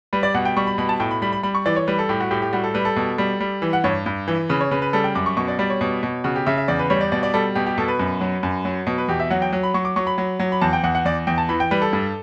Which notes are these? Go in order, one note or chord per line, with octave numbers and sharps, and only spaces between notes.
G3 B4
D5
B2 F#5
G5
G3 C#6
B5
B2 B5
A5
A2 G5
B5
G3 B5
B5
G3 B5
C#6
E3 D5
C#5
G3 B4
A4
A2 G4
F#4
A2 G4
G4
G3 F#4
A4
G3 B4
A4
B2
G3
G3
E3
F#5
G2 C#5
G2
E3
C#3 B4
C#5
C#3 B4
B4
G3 A4
G5
F#2 D6
C#6
B2 C#6
D5
G3 D5
C#5
B2
B2
C#3 F#4
G4
C#3 E5
E5
E2 D5
B4
G3 C#5
D5
B2 D5
D5
G3 A4
B2 G4
G4
B2 A4
B4
F#2
F#3
F#2
F#3
B2
B4
E2 G4
E5
F#3 F#5
G5
F#3
B5
F#3 C#6
D6
F#3 C#6
B5
F#3
F#3
B5
E2 A5
G5
E2 F#5
F#5
E2 D5
E2 G5
A5
E3 B5
G5
G3 B4
A4
G2